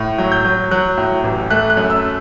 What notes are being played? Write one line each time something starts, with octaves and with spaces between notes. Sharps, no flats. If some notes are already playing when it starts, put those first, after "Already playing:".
Already playing: A2
F#3
G6
F#3
F#3 F#6
A2
A1
A3 F#6
F#6
F#2
E6